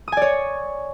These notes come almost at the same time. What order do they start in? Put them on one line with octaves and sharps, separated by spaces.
D#6 G#5 D5 C#5